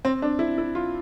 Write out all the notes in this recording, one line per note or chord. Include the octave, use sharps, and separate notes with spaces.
C4
D4
E4
E4
F4